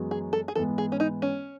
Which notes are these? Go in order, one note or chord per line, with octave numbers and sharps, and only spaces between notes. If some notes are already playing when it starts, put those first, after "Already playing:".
Already playing: F#2 E3 G#3 B3 F#4
G#4
A4
G#4
G#2 E3 B3 A4
G#4
C#4
D#4
C#4